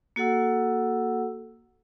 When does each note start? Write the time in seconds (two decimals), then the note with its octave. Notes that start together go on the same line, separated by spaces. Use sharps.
0.16 A#3 F#4 A4 F#5 E6